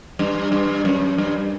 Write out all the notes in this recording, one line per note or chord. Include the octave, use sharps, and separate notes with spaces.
G2
G2
F#2
G2